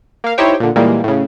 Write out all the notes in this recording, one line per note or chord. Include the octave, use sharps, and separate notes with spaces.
A#3 F5
D#4 E4 G4 C5 C#5 G5
A#2 D3
A#2 E3 G3 G#3 A#3
A2 C#3